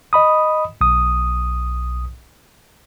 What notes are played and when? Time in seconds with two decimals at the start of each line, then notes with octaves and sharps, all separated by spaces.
0.13 D#5 B5 D#6
0.81 B1 D#6